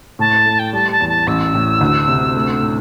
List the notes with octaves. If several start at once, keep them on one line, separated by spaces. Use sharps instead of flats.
A2 A5
A3
G5
G3 A5
A5
E2
A5
A1 E6
A2
D2
C3
A3
A2